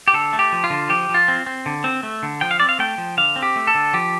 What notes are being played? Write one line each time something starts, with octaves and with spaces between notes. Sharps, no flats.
G4
D3 A4
A3
G4
F3
F4
D3
F3 G4
F3
F4
C4
C4
D3
C4
A3
D3
F3 G5
F5
C4 D5
F5
A3 G5
F3
D3 F5
C4
G4
A3
A4
D3
F3 G4